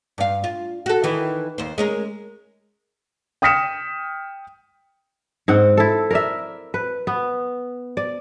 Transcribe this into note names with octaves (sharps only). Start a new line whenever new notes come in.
G2 F5
F4
F#4 A4
D#3 E3
D#2 C5
G#3 C#4 A#4
G5 D#6 F6 B6 C#7 E7
G#2 C4 F#5
E4 A4
A#4 D5 E5
B4
B3
D5